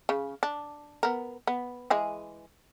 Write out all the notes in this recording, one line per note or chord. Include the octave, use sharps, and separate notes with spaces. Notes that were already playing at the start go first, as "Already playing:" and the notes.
C#3
D4
B3 A#4
B3
E3 G#3 G#4